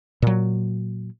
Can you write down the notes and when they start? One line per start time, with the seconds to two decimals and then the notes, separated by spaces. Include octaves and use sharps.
0.22 A#2 F#3